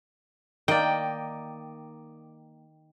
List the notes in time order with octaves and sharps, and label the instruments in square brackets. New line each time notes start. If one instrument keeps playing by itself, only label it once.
[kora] D#3 A#3 [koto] D5 D#5 [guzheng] G5